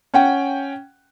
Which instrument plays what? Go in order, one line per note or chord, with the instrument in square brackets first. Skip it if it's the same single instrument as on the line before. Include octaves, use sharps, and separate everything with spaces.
[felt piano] C#4 F#5 G5